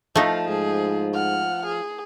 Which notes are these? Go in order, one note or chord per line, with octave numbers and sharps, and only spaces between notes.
F3 A3 D#4 F5
G#2 G#4
F#5 F6
G#4